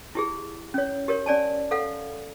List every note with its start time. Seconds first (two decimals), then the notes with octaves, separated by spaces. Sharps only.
0.15 E4 G4 G#4
0.74 C#4 C#5
1.08 G4 A#4 C#5
1.26 C#4 D5 G#5 A5
1.71 A4 F5 F#5